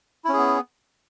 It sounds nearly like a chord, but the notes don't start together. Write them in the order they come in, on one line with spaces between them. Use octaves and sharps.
E4 C#4 G#4 B3